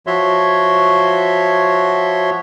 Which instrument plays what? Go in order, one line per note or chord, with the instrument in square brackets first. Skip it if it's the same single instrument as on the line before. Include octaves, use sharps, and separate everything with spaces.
[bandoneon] F3 F#4 C#5 E5 C6